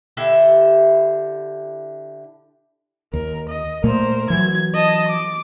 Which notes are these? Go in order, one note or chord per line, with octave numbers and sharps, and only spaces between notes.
D3 E4 G4 E5
D#2 A#4
D#5
A#2 A3 A#3 A#4 C5
E3 F#3 G#6
D#5 A5
D6